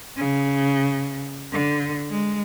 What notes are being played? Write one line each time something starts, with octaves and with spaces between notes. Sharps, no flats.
C#3
D3
G#3